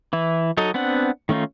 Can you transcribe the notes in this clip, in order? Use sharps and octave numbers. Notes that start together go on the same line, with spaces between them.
E3 E4
F#3 D#4 A4 D#5
B3 C4 D4 F#5
D#3 A3 C#4 D#4 F4